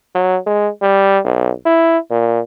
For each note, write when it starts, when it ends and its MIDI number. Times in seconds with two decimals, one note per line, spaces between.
0.15 0.37 54
0.46 0.68 56
0.82 1.19 55
1.24 1.52 35
1.66 1.98 64
2.11 2.40 46